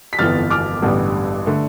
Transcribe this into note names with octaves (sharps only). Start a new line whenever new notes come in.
B6
G1 F2 E3 B3 F6 A6
D6 F6
A1 G2 D3 G3 B3
D3 A3